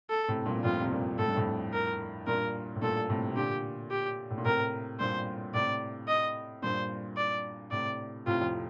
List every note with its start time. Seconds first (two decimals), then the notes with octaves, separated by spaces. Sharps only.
0.10 A4
0.28 A2 C3
0.46 G2 A#2
0.57 G2
0.64 F2 A2 F4
0.81 C3
0.91 G2 A#2
1.18 A2 A4
1.28 G2
1.36 F2 A2
1.73 A#4
2.27 G2 A#2 A#4
2.76 A2
2.82 G2 A#2 A4
3.09 A2 C3
3.29 C3
3.36 A#2 D3 G4
3.91 G4
4.30 A2
4.38 A#2
4.45 A2 C3 A#4
5.00 G2 A#2 C5
5.54 A2 C3 D5
6.08 D#5
6.62 G2 A#2 C5
7.17 D5
7.71 A2 C3 D5
8.26 A2 C3 F4
8.41 F2